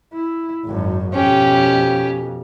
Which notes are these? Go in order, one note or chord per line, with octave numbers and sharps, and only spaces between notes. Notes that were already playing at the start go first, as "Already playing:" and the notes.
E4
G#1 F#2
F2 B2 C#4 G4